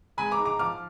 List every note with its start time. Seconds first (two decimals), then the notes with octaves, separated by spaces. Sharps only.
0.17 G#3 G#5 B5
0.31 A#5 D6
0.39 G#2
0.45 A#5 D6
0.59 F3 D6 F6